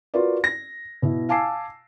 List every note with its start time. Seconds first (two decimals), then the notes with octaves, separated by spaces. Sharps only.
0.14 F4 F#4 A#4 B4 D5
0.44 A#6
1.02 B2 E4
1.29 F5 G#5 A5 D6 E6 C7